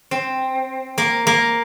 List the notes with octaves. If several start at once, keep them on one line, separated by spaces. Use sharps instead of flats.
C4
A#3
A#3